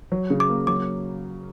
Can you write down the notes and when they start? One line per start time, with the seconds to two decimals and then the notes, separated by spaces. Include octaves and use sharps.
0.12 F#3
0.30 C#3
0.40 D6
0.49 A#3
0.67 F#3 D6